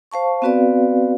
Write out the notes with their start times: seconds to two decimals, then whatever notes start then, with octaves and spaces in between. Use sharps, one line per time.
0.11 C5 F5 A5 C#6
0.42 B3 C4 F#4 B4 D5 F5